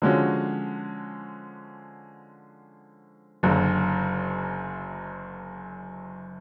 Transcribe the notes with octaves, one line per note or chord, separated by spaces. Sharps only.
D3 F3 G#3 C#4 F#4
F#1 F#2 D3